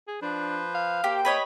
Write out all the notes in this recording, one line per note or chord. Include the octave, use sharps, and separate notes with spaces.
G#4
F3 D4 B4 C5
F5
A#3 G4 C5 G5
B4 C#5 D#5 B5